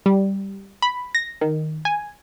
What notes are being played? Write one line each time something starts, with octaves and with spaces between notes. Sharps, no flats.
G3
B5
A#6
D#3
G#5